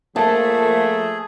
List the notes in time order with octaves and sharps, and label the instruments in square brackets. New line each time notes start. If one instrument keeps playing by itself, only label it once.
[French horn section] F3 A#3 [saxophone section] A3 [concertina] G#4 [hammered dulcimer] A5